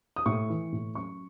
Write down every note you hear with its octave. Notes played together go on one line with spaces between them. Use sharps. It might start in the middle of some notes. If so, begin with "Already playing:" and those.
D#6
A2 C#6
E3
A2
F#2 C#6